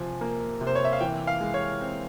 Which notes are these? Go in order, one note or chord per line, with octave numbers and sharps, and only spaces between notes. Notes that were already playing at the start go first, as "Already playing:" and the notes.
Already playing: C3 F3 G#5
A#3
C3
C5
C#5
E5
F5
E3 G5
F5
G#3
C#5
C4